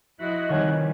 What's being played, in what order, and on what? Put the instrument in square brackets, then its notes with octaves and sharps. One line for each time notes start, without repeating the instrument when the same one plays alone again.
[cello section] F3 E4 F#4 [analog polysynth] D#5 F#6
[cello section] C3 E3 G3 [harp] D#3 G#5 [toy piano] C#5 F#5 C#6